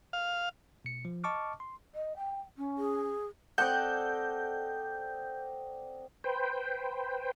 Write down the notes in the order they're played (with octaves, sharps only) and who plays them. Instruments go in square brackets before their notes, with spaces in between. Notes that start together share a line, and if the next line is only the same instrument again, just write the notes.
[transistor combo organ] F5
[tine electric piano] B2 C#7
F3
D#5 A5 C#6 D6 F6
C6
[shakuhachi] D#5
G5
C#4
[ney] G#4
[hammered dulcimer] C4 D5 D#5 [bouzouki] A4 [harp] F#5 [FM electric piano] G6
[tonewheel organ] B4 C5 G5